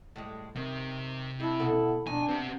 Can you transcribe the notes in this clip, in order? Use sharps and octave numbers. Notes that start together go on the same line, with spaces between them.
A2 G3 G#3
C3 D#3
G#3 D4 E4
D2 B2 A4
F2 B2 D#3 D4 G#5
B3 C4 F#4 G4